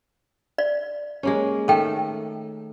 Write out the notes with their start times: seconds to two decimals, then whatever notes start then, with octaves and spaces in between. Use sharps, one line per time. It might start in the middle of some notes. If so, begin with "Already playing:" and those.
0.58 D5
1.23 G#3 A#3 C#4
1.68 D#3 A3 A4 G5